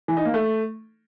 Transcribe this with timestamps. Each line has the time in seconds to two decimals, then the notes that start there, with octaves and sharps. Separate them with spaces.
0.08 E3
0.17 D#4
0.25 A#3
0.34 A3